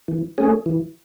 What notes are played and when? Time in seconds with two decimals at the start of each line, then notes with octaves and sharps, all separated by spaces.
0.08 E3
0.38 A3 C#4 G#4
0.66 E3